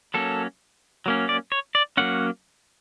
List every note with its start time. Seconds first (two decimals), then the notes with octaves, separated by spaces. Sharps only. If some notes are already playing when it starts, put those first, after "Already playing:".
0.14 F#3 A#3 C#4 A4
1.06 F#3 A#3 C#4
1.29 D5
1.52 C#5
1.75 D5
1.97 F#3 A#3 C#4 F#5